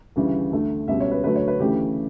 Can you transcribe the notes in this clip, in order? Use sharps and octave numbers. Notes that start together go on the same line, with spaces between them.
D2 C#3 E3 G3
D2 D3 A3
C#2 B2 G3 E5
C#5
B4
D2 D3 F#3 A3 B4
C#5
B4
D2 C#3 E3 A3 G4